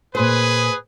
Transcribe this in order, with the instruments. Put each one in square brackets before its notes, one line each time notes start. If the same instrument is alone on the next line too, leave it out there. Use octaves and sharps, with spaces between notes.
[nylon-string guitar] A#2 C5 [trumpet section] G#4 B4